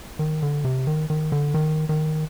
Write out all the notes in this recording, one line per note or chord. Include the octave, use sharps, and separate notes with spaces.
D#3
D3
C3
D#3
D#3
D3
D#3
D#3